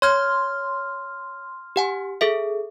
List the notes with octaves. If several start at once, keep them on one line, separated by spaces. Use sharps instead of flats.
C#5 C6 F6 G#6
G4 F#5 G#5
G#4 A4 E5